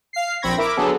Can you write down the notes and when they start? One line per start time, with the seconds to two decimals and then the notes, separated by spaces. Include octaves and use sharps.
0.13 F5 C7
0.42 A#1 C4 B5 C#6 G#6 A#6
0.58 E4 A#4 E5 D6
0.76 D3 F#3 B3 G#4 A4